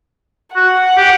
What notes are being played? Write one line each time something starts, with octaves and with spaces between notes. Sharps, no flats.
F#4 F#5
G4